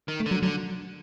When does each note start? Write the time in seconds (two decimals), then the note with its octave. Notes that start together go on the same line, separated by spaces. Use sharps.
0.08 D#3
0.20 A3
0.26 D3
0.31 F#3
0.43 D3 F#3